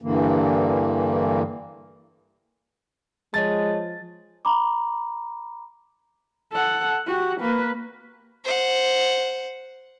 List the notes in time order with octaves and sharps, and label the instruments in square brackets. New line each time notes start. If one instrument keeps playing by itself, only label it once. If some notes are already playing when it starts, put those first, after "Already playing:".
[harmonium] G2 D3 E3 A#3
[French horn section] F3 [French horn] G#3 [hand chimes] C#5 D#5 A5 [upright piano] A6
[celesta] A#5 B5 D6
[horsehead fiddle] A4 F#5
F#4 G4
A#3 B4
[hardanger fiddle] C5 F#5